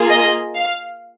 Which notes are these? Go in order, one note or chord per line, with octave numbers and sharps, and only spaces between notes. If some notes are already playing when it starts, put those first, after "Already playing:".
Already playing: A#3 F4 G#4
D#5
F5